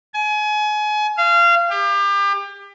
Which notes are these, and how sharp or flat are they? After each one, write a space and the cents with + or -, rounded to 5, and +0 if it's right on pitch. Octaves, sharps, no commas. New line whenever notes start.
G#5 +30
F5 -25
G4 +30